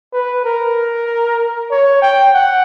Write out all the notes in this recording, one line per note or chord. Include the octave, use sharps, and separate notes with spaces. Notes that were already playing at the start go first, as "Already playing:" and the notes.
B4
A#4
C#5
G5
F#5